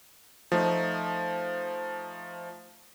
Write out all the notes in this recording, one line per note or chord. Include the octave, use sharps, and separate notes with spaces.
F3 A3 D#4